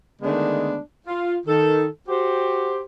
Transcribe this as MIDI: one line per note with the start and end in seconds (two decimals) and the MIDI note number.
0.22 0.76 50
0.22 0.76 51
0.22 0.76 56
0.22 0.76 57
0.22 0.76 59
0.22 0.76 62
1.07 1.37 65
1.46 1.86 51
1.46 1.86 69
2.08 2.80 66
2.08 2.80 67
2.08 2.80 72